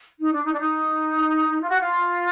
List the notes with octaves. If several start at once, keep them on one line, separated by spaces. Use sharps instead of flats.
D#4
D4
D#4
D4
D#4
F4
F#4
F4